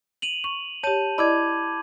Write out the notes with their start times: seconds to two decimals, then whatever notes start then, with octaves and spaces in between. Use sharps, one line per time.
0.22 D#7 F7 F#7
0.44 C#6
0.83 G4 C#5 A5 G6 D#7
1.18 E4 D5 D#5 B5 D6 G#6